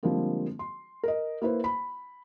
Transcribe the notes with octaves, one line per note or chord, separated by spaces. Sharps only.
D3 F3 G3 G#3 A#3 C4
C6
A#4 D#5
A#3 E4 B4 C5
B5